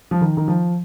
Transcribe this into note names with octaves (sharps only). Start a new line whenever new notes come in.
F3
D#3
D#3
F3